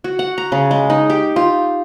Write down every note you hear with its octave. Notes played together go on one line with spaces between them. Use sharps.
F#4
F#5
A#5
C#3
G#3
D#4
G4
F4